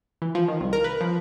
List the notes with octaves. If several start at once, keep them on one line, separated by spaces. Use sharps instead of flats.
E3
F3
D#3
C2
A#4
B4
F3